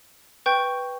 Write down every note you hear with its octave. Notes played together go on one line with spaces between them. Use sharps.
B4 G5 C#6 G6